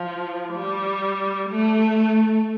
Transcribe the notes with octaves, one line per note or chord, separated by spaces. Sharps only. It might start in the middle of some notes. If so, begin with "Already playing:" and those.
Already playing: F3
G3
A3